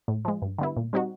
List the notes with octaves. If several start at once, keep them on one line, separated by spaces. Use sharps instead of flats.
A2
F3 G#3
G2
D3 G3 B3 E4
A#2
G3 C4 D#4 F#4